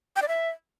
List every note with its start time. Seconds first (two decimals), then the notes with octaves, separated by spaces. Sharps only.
0.16 G5
0.22 D5
0.28 E5